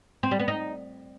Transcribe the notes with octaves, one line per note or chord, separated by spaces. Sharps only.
C4
G3
B3
D#4